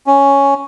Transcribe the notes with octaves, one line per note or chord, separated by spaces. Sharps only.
C#4